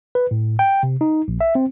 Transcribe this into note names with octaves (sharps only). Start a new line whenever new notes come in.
B4
A2
G5
C3
D#4
A#1
E5
C4